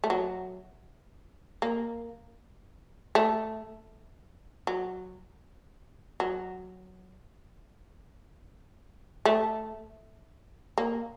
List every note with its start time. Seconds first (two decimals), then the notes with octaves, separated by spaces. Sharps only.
0.04 A3
0.10 F#3
1.62 A#3
3.15 A3
4.67 F#3
6.20 F#3
9.25 A3
10.78 A#3